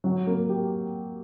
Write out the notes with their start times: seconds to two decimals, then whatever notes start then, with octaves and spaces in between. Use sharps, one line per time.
0.04 F#3
0.27 A#3
0.49 G4